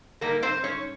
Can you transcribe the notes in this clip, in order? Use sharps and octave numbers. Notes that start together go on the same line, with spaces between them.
G#2 G3 A#3 D#4 A#4
C4 C5
C#4 C#5